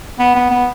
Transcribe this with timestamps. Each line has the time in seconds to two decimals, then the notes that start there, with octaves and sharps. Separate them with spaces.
0.19 B3
0.36 B3
0.51 B3